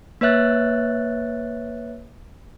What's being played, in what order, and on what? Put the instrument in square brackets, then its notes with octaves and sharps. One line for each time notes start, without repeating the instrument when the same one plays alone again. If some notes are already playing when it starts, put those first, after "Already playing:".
[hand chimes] A#3 B4 C#5 E5 F#6 A6